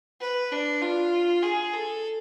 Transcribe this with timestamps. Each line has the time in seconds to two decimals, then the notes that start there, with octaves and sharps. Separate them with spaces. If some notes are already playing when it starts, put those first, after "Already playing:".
0.21 B4
0.52 D4
0.82 F4
1.43 G#4
1.74 A4